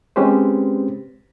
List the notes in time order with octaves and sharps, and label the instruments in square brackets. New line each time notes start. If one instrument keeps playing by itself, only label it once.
[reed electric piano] G#3 C4 C#4 G4 B4 C5